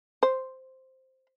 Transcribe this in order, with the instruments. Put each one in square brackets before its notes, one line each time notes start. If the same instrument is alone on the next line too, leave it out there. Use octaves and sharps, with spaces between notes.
[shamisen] C5